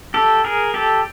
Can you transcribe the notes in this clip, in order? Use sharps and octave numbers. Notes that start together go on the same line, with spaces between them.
G4 A4
G#4 A#4
G4 A4